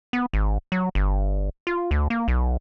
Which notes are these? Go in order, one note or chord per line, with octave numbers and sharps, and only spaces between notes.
B3
G#1
F#3
G1
F4
D2
A#3
B1